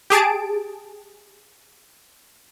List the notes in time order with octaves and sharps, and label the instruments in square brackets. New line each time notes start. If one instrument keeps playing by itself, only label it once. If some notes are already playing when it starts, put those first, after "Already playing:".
[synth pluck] G4 G#4 A5 D7